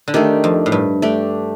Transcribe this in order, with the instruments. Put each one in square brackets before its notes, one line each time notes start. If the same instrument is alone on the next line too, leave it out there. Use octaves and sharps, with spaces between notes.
[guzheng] D3
[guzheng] D#3 [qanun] A3 D4 G4
[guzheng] F2
A2
G2
[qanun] A3 D4 G4